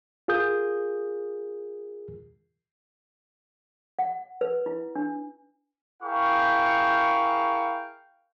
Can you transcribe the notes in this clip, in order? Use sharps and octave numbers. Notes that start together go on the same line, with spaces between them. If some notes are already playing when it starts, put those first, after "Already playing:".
F4 G#4 A#4 D#6 G6
F#5
B4
E4
D4
E4 G#4 A#4 F5 G5 C#6